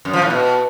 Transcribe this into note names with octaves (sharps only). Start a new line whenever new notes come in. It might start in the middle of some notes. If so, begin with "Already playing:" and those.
F#2
F3
A2
B2